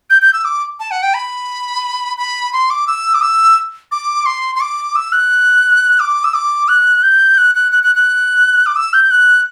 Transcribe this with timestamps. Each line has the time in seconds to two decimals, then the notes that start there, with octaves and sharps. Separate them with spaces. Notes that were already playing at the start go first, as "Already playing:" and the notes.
0.10 G6
0.22 G6
0.33 E6
0.45 D6
0.79 A5
0.91 F#5
1.03 G5
1.14 B5
2.18 B5
2.53 C6
2.70 D6
2.87 E6
3.14 D6
3.21 E6
3.92 D6
4.26 C6
4.55 C6
4.60 D6
4.96 E6
5.12 F#6
6.00 D6
6.24 E6
6.34 D6
6.68 F#6
7.03 G6
7.38 F#6
7.55 F#6
7.72 F#6
7.83 F#6
7.95 F#6
8.66 D6
8.76 E6
8.93 G6
9.11 F#6